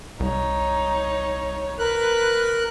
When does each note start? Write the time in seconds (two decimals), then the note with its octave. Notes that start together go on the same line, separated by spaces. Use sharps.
0.20 C2 D#4 C#5
1.79 A#4 B4 F#6